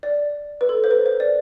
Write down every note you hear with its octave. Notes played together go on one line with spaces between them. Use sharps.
D5
B4
A4
C5
B4
C5
D5